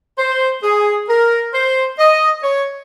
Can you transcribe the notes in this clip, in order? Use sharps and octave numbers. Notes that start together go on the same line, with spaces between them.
C5
G#4
A#4
C5
D#5
C#5